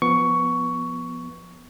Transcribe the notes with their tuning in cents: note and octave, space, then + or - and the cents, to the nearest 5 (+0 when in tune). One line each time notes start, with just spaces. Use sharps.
F3 +0 B3 -5 C#6 +10